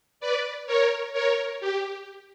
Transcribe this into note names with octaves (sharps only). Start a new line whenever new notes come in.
B4 D5
A#4 C#5
A#4 C#5
G4